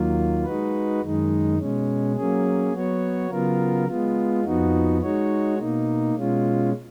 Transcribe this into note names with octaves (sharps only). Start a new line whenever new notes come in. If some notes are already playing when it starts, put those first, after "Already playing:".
Already playing: D#2 D#3 F#3 A#3 F4
G#3 D#4 F#4 B4
F#2 D#3 G#3 D#4
B2 G#3 C#4
F#3 A#3 C#4 G#4
F#3 B3 F#4 C#5
C#3 F#3 B3 F4 A#4
G#3 B3 F4
F2 F3 B3 D#4 F#4
G#3 D#4 F#4 C#5
B2 A#3 D#4
B2 G#3 C#4 F4